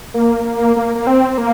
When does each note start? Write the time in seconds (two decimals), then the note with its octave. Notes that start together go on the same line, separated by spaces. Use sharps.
0.14 A#3
0.45 A#3
0.76 A#3
0.95 A#3
1.07 C4
1.38 A#3